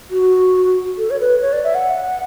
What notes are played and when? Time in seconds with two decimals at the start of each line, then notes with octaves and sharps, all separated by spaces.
0.11 F#4
0.98 A4
1.10 C#5
1.20 B4
1.42 C#5
1.53 D5
1.64 E5
1.75 F#5